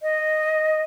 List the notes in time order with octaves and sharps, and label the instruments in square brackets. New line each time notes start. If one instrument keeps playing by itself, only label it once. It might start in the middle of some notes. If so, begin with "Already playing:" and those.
[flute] D#5